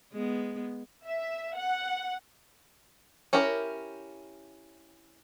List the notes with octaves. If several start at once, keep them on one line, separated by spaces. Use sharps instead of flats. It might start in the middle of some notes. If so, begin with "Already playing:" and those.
G#3 B3
E5
F#5
C#4 E4 G4 A#4